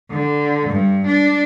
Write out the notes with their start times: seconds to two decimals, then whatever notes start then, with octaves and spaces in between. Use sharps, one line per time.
0.12 D3
0.70 G2
1.07 D4